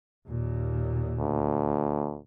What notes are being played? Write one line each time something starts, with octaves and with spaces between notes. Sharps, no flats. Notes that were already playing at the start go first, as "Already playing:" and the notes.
D#2 A#2
D2